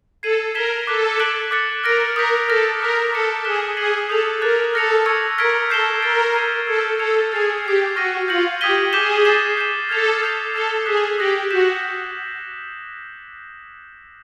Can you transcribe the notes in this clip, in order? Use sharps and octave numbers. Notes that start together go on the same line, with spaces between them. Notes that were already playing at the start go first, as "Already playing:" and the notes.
A4 G#6 C7 D#7 F#7
A#4 G#6 B6 E7 G7
A4 D6 F#6 B6
F#6 B6 D7 F#7
D6 F#6 A6 C#7
A#4 F6 A#6 D7
A#4 D#6 G6 B6
A4 D6 F6 A#6
A#4 D6 F#6 B6
A4 D6 F6 A#6 C#7 E7
G#4 D#6 F#6 B6 E7 G7
G#4 G#6 C7 D#7 F#7
A4 D#6 G6 C7 F7
A#4 D6 F#6 A6
A4 F6 A#6 C#7 F7
C#6 E6 G#6 C#7
A#4 F6 G#6 B6 D7
A4 G6 C7 E7 G7
A#4 F6 A6 D7
G#6 C7 D#7
A4 E6 G#6 C#7 E7
A4 F6 G#6 C#7 F7
G#4 F6 A6 C7 F7
G4 E6 G#6 C7
F#4 C#6 F6 A#6 D#7
F4 G6 A#6 C#7 F#7
G4 D#6 G#6 B6 D#7 G7
G#4 D6 G6 B6 E7 G7
A6 C7 E7
G6 C7 E7
A4 F6 G#6 C7 F7
D#6 G6 C7 F7
A4 E6 G6 C7 E7 G7
G#4 D#6 F#6 B6 E7
G4 D#6 F#6 A#6 C#7 F#7
F#4 G6 B6 E7